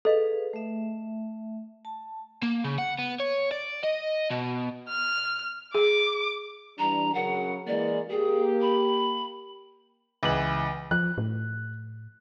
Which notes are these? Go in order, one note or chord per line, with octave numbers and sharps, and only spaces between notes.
G#4 A4 B4 D#5 F5
A3 E5
A5
A#3
C#3
F#5
B3
C#5
D5
D#5
B2
F6
G#4 D6
E3 G3 D4 A#5
C#3 F#3 A#4 F#5
E3 G#3 A#3 D5
A#3 G4 G#4
B5
C#2 E3 F#7
F3 F#6
A2